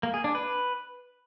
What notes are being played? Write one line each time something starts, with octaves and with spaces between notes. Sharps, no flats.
A#3
G#4
D4
B4